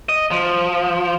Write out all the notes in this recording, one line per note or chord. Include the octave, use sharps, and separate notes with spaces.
D#5
F3